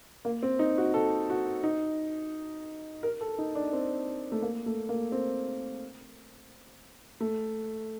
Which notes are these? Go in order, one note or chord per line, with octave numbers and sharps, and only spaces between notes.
A#3
C4
D#4
F#4
A4
F#4
D#4
A#4
A4
D#4
D4
C4
A3
A#3
A3
A#3
C4
A3